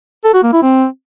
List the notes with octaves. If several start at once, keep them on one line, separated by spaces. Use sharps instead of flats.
A4
F#4
A#3
E4
C4